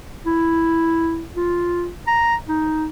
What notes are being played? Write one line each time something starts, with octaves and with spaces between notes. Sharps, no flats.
E4
F4
A#5
D#4